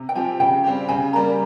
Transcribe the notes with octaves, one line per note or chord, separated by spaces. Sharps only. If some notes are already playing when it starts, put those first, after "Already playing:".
Already playing: C3
G5
F3 C4 G4 G#5
C#3 G5
G3 C4 G4
C#3 G#5
G3 A#3 A#5